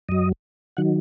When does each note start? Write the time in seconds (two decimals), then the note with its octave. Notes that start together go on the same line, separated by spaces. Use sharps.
0.09 F#2 F#3 D#5
0.77 D#3 F#3 F#5